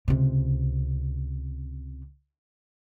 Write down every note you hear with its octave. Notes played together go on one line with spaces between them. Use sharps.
C#2 C3